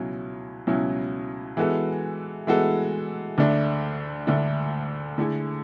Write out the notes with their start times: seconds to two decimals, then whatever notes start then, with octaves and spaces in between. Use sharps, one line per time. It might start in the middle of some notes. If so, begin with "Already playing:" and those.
Already playing: C#2 B2 F#3 C#4 E4
0.67 C#2 B2 F#3 C#4 E4
1.57 E3 G#3 B3 F#4 A4
2.47 E3 G#3 B3 F#4 A4
3.38 D2 D3 A3 D4
4.27 D2 D3 A3 D4
5.18 D3 A3 E4 G#4